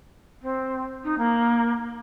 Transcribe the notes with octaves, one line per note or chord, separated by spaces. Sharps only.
C4
D#4
A#3